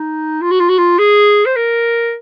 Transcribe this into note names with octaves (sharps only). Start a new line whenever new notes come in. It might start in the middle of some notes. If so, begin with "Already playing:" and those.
Already playing: D#4
F4
F#4
F4
F#4
F4
G#4
C5
A#4